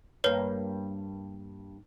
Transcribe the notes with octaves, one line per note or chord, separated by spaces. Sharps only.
G2 A#3 B4 C#5